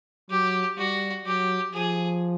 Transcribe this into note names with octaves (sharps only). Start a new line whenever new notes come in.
F#3 G4
G3 F#4
F#3 G4
F3 G#4